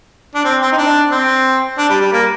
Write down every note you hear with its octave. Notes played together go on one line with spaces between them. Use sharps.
D4
C4
C4
D#4
D4
C4
D4
G3
G3
A#3